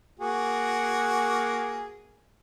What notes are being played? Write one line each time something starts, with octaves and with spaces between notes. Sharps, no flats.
A#3 F#4 G#4